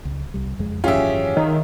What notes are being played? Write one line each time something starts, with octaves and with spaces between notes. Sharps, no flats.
C#2
C2 G3
F#1 F2 G#3
G#1 F#2 E3 C#4 F4 G4 G#4 E5
D#3